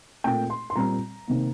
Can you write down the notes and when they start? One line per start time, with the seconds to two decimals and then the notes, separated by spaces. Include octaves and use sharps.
0.24 A#2 A3 C4 G5
0.50 C6
0.70 C6
0.76 A#2 G3 C4 A#5
1.28 C3 D#3 A#3